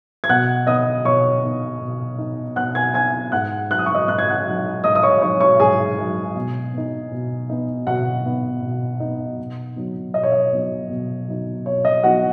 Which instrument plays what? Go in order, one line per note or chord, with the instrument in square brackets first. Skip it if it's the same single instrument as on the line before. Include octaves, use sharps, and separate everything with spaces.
[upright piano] G#6
B2 F#5 F#6
B3 D#4 D#5 D#6
B2 C#5 C#6
B3 D#4
B2
B3 D#4
B2 F#5 F#6
G#5 G#6
B3 D#4 G#5 G#6
G#2 F#5 F#6
F#3 D#4 F#6
D#6
C#6
D#5 D#6
G#2 F#6
G#6
F#5 F#6
F#3 D#4
G#2 D#5 D#6
D#6
C#5 C#6
F#3 D#4 C#5 C#6
C#5 C#6
G#2 G#4 G#5
F#3 D#4
B2
B3 D#4
B2
B3 D#4
B2 F#4 F#5
B3 D#4
B2
B3 D#4
B2
F#3 B3 D#4
B2 D#5
C#5
D#5
F#3 B3 D#4
B2
F#3 B3 D#4
B2 C#5
D#5
F#3 B3 D#4 F#4 F#5